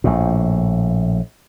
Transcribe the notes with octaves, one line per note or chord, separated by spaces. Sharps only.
A#1 A2